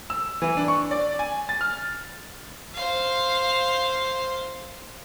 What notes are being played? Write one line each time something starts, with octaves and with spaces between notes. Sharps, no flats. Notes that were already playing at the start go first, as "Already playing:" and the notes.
E6
E3
D4
C#6
D5
G#5
A6
F6
C5 F5